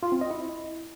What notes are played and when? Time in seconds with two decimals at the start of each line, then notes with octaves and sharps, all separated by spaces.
0.03 F4
0.12 C4
0.21 D#5
0.31 E4